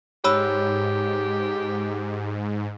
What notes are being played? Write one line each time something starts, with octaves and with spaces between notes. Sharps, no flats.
G#2 G4 C#5 B5 E6